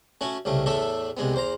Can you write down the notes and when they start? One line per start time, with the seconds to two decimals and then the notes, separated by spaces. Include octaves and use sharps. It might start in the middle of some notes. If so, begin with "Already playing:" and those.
0.21 A3 C#4 F#4
0.45 C2 C#3 A3
0.66 E2 A2 A3 A4 E5
1.17 C2 G#3 B3
1.34 E2 C5 A#5